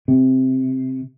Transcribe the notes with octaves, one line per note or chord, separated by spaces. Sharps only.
C3